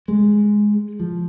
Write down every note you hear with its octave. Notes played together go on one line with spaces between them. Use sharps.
G#3
F3